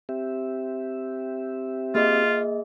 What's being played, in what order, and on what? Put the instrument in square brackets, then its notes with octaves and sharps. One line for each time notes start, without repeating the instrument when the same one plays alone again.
[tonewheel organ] C4 G4 E5
[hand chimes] A#3 G#4 D#5 [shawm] F4